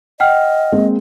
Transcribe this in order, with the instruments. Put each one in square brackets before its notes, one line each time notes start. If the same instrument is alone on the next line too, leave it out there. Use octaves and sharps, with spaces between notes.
[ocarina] D#5 [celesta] F#5 G5 F6
[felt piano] G#3 A#3 C4